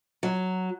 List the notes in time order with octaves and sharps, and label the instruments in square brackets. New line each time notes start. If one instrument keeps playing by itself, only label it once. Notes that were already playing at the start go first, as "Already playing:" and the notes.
[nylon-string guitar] F#3